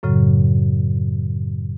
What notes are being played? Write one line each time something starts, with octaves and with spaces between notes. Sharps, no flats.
F#2 A2 C#3 F#3